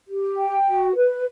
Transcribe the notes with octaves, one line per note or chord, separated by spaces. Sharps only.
G4
G5
F#4
B4